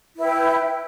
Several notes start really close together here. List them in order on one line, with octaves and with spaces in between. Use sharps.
E4 B4 G5